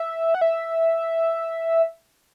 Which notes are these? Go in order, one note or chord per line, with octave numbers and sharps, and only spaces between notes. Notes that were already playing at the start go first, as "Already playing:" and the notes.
Already playing: E5
F#5
E5